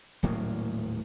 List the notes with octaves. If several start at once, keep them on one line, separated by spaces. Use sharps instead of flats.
D#1 A2 F#3 A#3